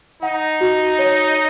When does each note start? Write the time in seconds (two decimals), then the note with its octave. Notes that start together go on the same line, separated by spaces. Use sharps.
0.23 D#4 F#5
0.61 F#4
0.99 C#5